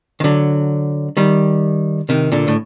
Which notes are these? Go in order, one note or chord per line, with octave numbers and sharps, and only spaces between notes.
D#3
D3 F#3
D#3 G3
C3 D#3
A#2 D3
A2